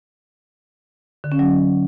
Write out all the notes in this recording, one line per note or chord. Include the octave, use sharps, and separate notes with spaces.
D3
C#4
F#3